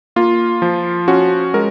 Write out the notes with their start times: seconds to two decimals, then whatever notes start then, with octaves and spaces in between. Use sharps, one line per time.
0.16 A#3 F4
0.62 F3
1.08 C#4 F#4
1.54 G#3 A#4